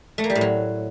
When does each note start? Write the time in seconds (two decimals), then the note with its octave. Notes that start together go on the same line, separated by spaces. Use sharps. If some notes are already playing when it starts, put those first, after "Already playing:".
0.18 A3
0.24 A#3
0.30 G3
0.35 A2
0.41 F#3